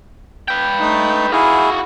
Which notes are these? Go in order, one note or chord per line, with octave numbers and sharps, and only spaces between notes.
B4 G5
A3 D#4
E4 F#4 G#4 F5